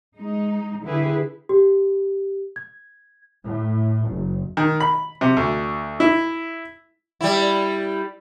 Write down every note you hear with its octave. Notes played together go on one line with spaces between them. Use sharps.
G#3 D#4
D3 E4 G4 G#4 B4
G4
G#6
A2
F#1
D#3
B5
C3
D2
E4
G3 E4